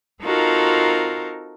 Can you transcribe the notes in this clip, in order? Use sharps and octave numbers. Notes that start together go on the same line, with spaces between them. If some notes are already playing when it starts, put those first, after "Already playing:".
C4 D#4 F4 F#4 A4 A#4